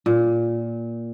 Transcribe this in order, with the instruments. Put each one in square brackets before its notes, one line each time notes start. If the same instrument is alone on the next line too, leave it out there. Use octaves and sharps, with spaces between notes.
[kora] A#2